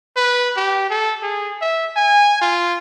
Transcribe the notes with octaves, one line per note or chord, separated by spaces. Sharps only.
B4
G4
A4
G#4
E5
G#5
F4